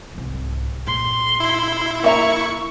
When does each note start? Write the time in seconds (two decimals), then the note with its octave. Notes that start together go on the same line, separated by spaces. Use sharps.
0.15 C2 G#2
0.87 A#2 C6
1.40 E4
2.04 A#3 E5 A#5 C#6